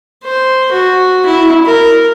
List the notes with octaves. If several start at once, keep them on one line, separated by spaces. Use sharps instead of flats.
C5
F#4
E4
A#4